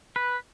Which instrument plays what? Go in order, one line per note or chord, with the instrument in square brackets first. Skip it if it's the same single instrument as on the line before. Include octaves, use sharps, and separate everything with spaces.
[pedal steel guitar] B4